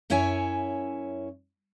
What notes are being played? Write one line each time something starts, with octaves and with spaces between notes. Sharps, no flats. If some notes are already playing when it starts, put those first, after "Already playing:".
F#2 C#4 E4 C#5 E5 G#5